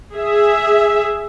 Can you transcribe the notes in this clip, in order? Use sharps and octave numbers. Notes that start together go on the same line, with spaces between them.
G#4 E5